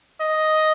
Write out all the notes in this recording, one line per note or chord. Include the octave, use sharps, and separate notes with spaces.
D#5